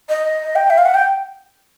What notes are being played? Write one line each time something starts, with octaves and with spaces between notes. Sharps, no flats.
D#5
G5
E5
F5
F#5
G5